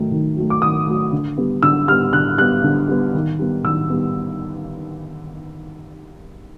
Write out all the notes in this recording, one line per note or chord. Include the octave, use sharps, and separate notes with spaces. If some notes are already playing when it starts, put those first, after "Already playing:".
Already playing: D#3 F#3 A3
D#3
F#3 A3
D6
D#3 D#6
F#3 A3
D3
G3 B3
D3 E6
G3 B3 F6
D3 F#6
G3 B3 F#6
D3
G3 B3
D#3
G3 B3
D#3 E6
G3 B3